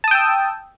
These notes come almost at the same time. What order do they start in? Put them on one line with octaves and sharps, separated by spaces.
A5 D#6 G5 E6